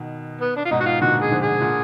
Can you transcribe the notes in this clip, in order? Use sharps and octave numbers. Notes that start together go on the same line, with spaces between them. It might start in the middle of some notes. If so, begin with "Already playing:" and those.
Already playing: B2 D#3
B3
D4
F4
G#2 B2 D#4
F#4
F4
A#2 D3 F#4
G#4
D3 F3
G#4
A#2 D3